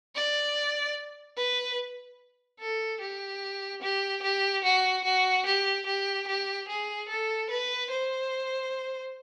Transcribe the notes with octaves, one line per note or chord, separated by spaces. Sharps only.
D5
B4
A4
G4
G4
G4
F#4
F#4
G4
G4
G4
G#4
A4
B4
C5